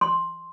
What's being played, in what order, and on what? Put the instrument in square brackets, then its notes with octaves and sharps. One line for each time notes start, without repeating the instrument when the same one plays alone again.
[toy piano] C6